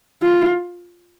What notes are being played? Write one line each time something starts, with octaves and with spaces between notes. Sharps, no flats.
F4